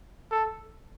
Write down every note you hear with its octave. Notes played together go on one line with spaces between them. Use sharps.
A4